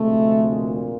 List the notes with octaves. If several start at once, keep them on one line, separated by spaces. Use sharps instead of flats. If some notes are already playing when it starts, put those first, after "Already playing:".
Already playing: D2 C3 F3 G#3 A3
A#2 A#3